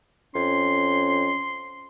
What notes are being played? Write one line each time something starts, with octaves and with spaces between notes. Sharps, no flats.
F2 C#4 C6